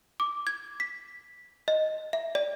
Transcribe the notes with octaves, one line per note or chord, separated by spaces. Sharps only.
D6
G#6
B6
D#5
E5
D5